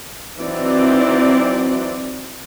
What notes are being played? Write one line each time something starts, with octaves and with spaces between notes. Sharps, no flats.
E3 F#3 C4 D#4 D5